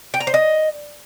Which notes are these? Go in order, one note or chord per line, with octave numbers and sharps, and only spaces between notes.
G5
A#5
C5
D#5